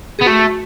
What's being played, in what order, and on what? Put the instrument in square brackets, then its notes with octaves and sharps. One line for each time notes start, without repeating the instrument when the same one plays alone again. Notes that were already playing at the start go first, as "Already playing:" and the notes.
[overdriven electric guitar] B3 [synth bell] G#4
[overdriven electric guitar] A3 [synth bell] F#4